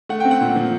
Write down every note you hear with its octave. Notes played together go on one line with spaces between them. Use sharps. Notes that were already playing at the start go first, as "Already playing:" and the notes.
A3 F#5
C4 G5
F#5
A#2
F3